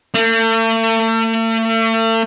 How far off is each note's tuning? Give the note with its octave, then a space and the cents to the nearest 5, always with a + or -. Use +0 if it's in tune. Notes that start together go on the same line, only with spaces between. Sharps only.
A3 +40